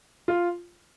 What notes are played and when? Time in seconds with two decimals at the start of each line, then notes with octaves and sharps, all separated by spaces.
0.28 F4